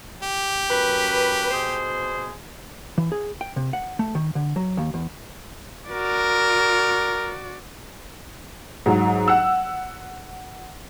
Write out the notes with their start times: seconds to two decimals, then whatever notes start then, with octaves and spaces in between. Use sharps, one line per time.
0.23 G4
0.70 F#2 B4
1.51 B2 G#4 C5
2.98 E3
3.12 G#4
3.41 G5
3.56 C3
3.73 F#5
3.99 A3
4.15 D#3
4.35 D3
4.56 F#3
4.77 D#2
4.94 E2
5.90 F#4 A#4 D5
8.86 G#2 F#3
9.28 F#5 E6